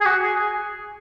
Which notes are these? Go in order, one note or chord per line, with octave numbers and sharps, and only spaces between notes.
G#4
F#4
G#4
G#4